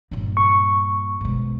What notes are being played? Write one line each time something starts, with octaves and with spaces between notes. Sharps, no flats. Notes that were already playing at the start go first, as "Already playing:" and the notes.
G2 A#2
C#6
G#2 B2